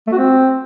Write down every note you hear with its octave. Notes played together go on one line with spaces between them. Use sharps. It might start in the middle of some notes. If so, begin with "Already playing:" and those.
A3
F#4
C4